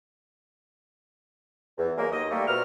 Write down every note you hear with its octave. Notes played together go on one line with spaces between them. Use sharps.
E2
F#3 G#3 A#3
D#2 D#5
G3 A3 A#3
A#2 B3 F#4 C5 A#5 F6